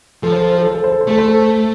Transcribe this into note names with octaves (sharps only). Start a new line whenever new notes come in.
F3 A4
C5
A4
C5
A4
C5
A4
C5
A4
C5
A3 A4
C5
A4